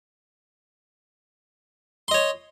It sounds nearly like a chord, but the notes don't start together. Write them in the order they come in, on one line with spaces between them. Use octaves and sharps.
C6 D#5 C#5